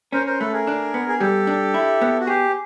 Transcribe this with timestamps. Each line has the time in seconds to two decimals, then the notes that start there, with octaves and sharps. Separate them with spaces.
0.12 C#4 A#4 C5
0.26 A#4 C5
0.39 A3 A4 B4
0.53 G#4 A#4
0.67 D4
0.94 B3
1.09 G#4
1.20 G3 G4 A4
1.47 D4
1.74 E4
2.01 B3
2.20 F#4
2.27 G4 G#4